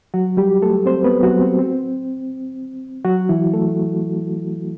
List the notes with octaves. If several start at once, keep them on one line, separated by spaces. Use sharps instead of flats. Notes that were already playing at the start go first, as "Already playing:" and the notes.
F#3 F#4
G3 G4
A3 A4
C4 C5
B3 B4
F#3 F#4
C4
C4
F#3 F#4
E3 E4
A3 A4